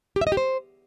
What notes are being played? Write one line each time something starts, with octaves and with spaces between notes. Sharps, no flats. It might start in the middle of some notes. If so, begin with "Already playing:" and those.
G4
E5
D#5
G4
C5